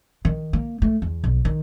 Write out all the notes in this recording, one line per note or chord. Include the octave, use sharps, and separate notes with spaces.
D#3
A#3
A3
E2
B1
D#3